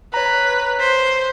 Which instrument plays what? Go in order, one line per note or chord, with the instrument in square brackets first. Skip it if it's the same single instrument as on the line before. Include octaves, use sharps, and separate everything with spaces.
[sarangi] B4 [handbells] C#5 A#5
[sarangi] C5 [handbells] B6